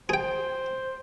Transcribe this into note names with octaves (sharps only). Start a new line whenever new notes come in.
G#4 C5 G5